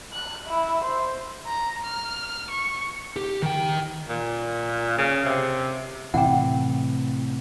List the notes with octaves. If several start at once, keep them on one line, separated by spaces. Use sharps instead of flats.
F#6
E4
C5
A#5
F6
C#6
G4
D#3 G5
A#2
C#3
C3
A2 C3 E3 F#5 G5